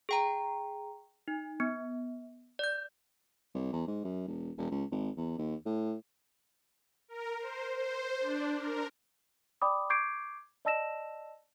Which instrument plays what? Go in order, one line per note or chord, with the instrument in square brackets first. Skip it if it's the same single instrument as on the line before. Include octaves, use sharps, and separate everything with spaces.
[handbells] G#4 G5 A#5
D#4
B3
D5 G6
[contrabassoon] C2
E2
G#2
F#2
E1
E1
C#2
G#1
E2
D#2
A2
[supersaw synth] A#4
C5
C5
D4
A#4
[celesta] D5 G5 B5 D6 D#6
C#6 D6 G6 G#6 C7 D7
D5 D#5 A5 E6 A#6 E7